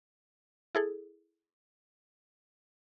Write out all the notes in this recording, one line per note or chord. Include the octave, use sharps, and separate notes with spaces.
E4 G#4 A4